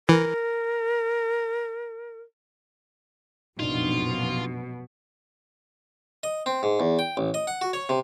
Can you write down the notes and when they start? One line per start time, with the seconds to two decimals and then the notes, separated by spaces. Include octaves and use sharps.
0.09 E3 A#4
3.60 F1 A#1 F#2 B2 D4 D#4 F4
6.23 D#5
6.46 C4
6.63 G#2
6.80 E2
6.99 G5
7.17 A1
7.34 D#5
7.47 F#5
7.61 F#4
7.73 C#5
7.89 C3